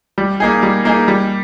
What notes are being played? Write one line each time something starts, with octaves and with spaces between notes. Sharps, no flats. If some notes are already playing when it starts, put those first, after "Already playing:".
G3
A#3 D#4 G#4
G3
A#3 D#4 G#4
G3